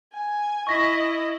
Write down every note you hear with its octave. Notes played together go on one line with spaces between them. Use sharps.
G#5
E4 D#5 C#6 A#6 B6